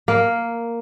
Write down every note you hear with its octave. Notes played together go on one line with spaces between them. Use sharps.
A#3